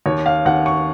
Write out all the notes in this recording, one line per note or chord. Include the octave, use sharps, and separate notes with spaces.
D#2 C#5
F5
D#2 F#5
C#6